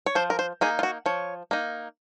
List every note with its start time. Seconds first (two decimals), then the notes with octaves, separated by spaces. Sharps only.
0.06 C#5
0.15 F3 C5
0.30 A#4
0.39 C5
0.61 A#3 D#4 G#4
0.79 F4
0.83 F#4
1.06 F3 C#5
1.51 A#3 D#4